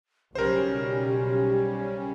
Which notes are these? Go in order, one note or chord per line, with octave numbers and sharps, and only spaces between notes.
B1 C#3 G3 C#4 G4 A#4 C5